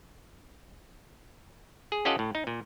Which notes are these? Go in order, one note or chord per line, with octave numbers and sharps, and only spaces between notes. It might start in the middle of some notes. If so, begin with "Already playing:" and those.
G#4
C#4 F4 G4 A4 D#5 F#5
A2
D#4
A#2